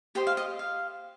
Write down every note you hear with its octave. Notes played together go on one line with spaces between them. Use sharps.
G4 C5 D#5 G5
F5
D#5
F5